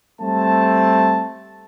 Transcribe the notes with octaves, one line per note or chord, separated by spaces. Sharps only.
G3 A3 C4 A5